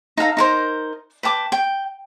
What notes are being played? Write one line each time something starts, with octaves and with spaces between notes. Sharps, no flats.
D#4 A4 F5 A#5
D#4 A#4 C5
B4 G5 A5 D6
G5